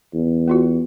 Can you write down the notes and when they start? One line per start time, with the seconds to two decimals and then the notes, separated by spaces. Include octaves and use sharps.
0.14 E2
0.48 B3 F4 F#4